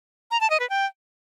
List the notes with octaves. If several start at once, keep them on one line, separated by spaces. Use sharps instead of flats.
A#5
A5
D#5
B4
G5